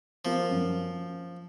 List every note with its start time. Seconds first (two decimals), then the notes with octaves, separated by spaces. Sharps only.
0.25 F3 A#3
0.51 F#2